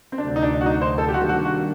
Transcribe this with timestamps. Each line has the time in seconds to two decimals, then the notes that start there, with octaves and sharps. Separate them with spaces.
0.12 C4
0.18 D2 C3 F#3 A3 D4
0.36 D#4
0.43 D4
0.61 F#4
0.66 D#4
0.82 C5
0.98 A4
1.08 G4
1.14 D#3 G3 A#3 D4 F#4
1.29 F#4
1.45 F#4